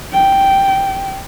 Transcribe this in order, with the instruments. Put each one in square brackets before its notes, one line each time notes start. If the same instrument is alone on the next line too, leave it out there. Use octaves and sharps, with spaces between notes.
[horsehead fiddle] G5